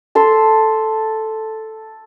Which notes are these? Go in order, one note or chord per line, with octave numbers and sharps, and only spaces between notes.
A4 C6